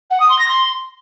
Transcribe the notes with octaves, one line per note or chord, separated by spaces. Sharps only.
F#5
D#6
C6
A#6
C6